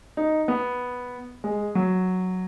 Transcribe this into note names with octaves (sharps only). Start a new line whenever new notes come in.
D#4
B3
G#3
F#3